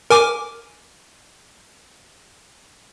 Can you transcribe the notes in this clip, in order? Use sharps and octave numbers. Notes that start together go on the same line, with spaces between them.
A#4 G#5 D6